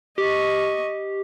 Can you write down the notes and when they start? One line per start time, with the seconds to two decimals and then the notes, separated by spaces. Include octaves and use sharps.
0.18 G4 D#5 C#6